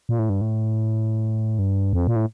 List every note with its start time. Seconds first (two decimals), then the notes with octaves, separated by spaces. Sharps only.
0.09 A#2
0.19 A2
0.30 G2
0.41 A2
1.59 G2
1.93 F2
2.07 A#2
2.16 A2